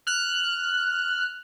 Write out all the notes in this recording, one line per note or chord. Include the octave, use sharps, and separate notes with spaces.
F6 F#6